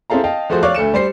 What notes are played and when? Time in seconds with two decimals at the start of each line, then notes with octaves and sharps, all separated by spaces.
0.10 C4 E4 G#4 A4 F5 A#5
0.24 D#5 F5 G5 A5
0.50 F3 A3 F#4 G#4 C5
0.63 C#5 D5 F5 C#6 D6 F#6
0.75 D2 A3 C#7 E7
0.94 G3 C5 C7